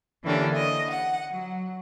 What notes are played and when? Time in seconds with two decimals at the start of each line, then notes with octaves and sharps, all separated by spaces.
0.23 D3 E3 A#3 C#4 D4 G4
0.54 D#5
0.91 F#5
1.31 F#3